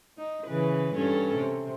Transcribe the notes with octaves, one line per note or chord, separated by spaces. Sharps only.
D#4
C#3 E3 B4
G2 C#4 A4
C3